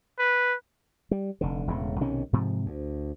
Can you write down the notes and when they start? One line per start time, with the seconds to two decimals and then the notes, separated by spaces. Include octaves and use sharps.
0.19 B4
1.11 G3
1.41 F1 D3
1.67 E1 A2 C#3
2.01 B1 C3 D#3 C#4
2.33 G#2 C3 F3
2.66 D2